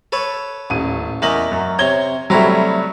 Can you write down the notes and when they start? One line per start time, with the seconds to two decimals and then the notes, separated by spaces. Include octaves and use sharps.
0.12 A4 B4 C#5
0.70 D#1 A1 D#7
1.22 E2 A3 A#4 D#5 F#7
1.52 F#2
1.79 C3 C#5 A#5 G#6 G7
2.30 C3 F#3 G3 A3 E4 A#5